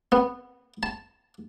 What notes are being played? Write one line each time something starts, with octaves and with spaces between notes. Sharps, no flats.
B3
A5